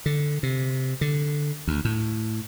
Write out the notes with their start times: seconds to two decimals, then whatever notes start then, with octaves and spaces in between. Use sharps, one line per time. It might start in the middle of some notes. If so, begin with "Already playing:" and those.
0.06 D3
0.43 C3
1.01 D3
1.68 D2
1.85 A2